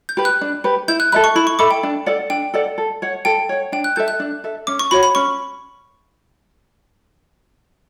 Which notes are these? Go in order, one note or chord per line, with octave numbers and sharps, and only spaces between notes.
G6
G4 B4
F#6
D4
G4 B4
E4 G6
F#6
A4 E5 B5 F#6
C#6
E4 B5
C#6
A4 E5 B5 D6
G5
D4
A4 D5 F#5
D4 G5
A4 D5 F#5
A4
C#5 F#5
A4 G5
C#5 F#5
D4 G5
F#6
A4 E5 G6
F#6
D4
A4 E5
C#4 D6
C#6
F#4 C#5 F#5 B5
B5
C#4 C#6